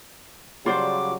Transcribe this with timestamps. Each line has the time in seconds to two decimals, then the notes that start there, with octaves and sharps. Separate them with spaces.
0.66 C#3 F#3 G3 F4 C5 D5 D6